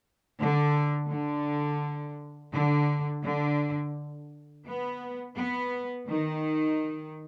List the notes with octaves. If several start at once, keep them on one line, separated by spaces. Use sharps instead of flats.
D3
D3
D3
D3
B3
B3
D#3